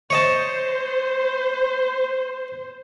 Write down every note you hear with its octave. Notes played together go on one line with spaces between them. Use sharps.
C5 C#5 D#5 A5